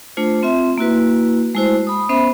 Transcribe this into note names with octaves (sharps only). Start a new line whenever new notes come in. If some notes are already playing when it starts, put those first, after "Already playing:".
A3 D4 F4 C5
C4 F4 E5 C6
A#3 E4 F#4 B4
G#3 A3 E4 F#4 C5
B5 D#6
B3 C#4 C5 E5 B5